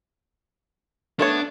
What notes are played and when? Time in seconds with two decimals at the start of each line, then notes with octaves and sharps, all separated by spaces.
1.19 A3 B3 D4 C#5